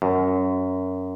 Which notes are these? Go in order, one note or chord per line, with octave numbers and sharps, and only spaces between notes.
F#2